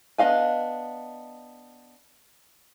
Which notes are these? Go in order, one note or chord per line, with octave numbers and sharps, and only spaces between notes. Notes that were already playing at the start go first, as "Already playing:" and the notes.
B3 D4 D#5 F5 G#5